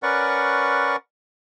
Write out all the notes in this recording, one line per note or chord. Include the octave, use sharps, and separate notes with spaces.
C#4 A#4 B4 D5 F#5 C#6